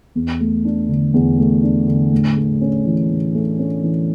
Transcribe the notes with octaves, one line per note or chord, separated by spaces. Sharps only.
E2
A3
D4
D3
E2
A3
D4
D3
A2
A3
C#4
E3
A2
A3
C#4
E3